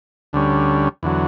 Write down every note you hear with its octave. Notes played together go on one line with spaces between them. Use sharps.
D2 D3 G3 C#4
E2 D3 F#3